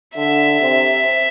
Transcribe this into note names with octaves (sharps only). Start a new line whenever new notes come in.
D3 E5
C3